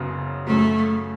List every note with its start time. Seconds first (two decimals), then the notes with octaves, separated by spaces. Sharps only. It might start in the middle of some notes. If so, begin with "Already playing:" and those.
Already playing: F#1 F#2 C#3 F#3 B3
0.47 F#2 C#3 F#3 A3